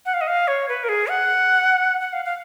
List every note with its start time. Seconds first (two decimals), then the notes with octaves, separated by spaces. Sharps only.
0.06 F#5
0.14 F5
0.21 D#5
0.28 F5
0.48 C#5
0.69 B4
0.84 A#4
0.89 G#4
1.09 F#5
2.01 F#5
2.13 F5
2.25 F5